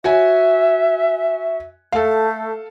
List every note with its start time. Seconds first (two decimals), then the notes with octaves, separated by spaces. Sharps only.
0.04 F#4 C#5 E5 G#5
1.92 A3 A4 F5